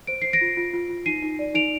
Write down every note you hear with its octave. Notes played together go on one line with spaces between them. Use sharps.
C5 D7
C5 C7
A#6 D7
F4
F4
F4
F4
D#4 C7 D#7
D#4
D5
D#4 D7 F7